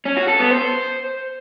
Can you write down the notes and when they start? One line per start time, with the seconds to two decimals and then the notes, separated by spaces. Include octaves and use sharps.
0.05 C#4
0.17 F#4
0.28 A4
0.39 B3
0.51 C5